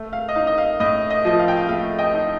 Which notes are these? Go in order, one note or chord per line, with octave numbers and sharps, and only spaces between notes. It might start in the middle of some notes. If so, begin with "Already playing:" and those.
Already playing: A3
F5
D#5
D#4 F5
D#5
F5
A2 D#5
D#5
F3 D#5
F5
G5
F5
A3 F5
D#5 G5
D#4